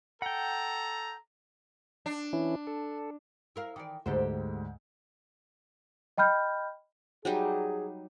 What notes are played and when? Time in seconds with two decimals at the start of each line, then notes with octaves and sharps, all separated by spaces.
0.22 A4 F#5 G5 A#5
2.06 D4
2.33 E3 C#4 E4
2.67 A4
3.56 E4 A#4 F5
3.76 D#3 E3 D5
4.06 D2 G#2 G4 A4 C5
6.18 D#5 G5 B5 F6 G6
7.25 F#3 G3 D#4 G#4